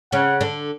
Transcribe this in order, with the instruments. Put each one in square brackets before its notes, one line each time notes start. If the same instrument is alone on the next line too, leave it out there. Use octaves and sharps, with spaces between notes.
[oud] C#3 C#4 [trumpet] F#5
[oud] D3 D4